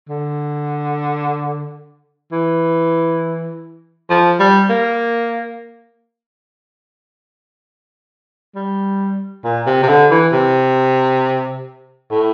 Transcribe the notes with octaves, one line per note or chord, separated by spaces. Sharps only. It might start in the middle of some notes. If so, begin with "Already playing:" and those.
D3
E3
F3
G3
A#3
G3
A#2
C3
C3
D3
E3
C3
A2